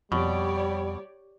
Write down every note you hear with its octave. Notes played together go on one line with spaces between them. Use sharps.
F2 B2 G3 G4 C#5 D5